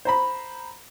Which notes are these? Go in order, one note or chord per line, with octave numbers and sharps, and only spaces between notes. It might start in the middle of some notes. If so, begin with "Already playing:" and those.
C5 A#5 B5